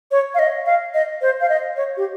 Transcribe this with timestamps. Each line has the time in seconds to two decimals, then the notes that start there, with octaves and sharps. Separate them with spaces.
0.11 C#5
0.35 F5
0.39 D#5
0.66 F5
0.94 D#5
1.22 C5
1.41 F5
1.49 D#5
1.76 C#5
1.97 G4